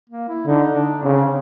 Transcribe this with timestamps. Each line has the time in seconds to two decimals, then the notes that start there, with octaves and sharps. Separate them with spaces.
0.10 A#3
0.28 E4
0.47 D3 D#4
0.75 D4
1.03 C#3 C4